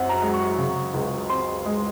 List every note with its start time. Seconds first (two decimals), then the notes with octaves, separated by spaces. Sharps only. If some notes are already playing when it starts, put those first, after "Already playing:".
Already playing: F#2 C4 F#5
0.09 A#5
0.22 G#3
0.34 C#6
0.58 C#3
0.94 C#2
1.29 C4 C6
1.66 G#3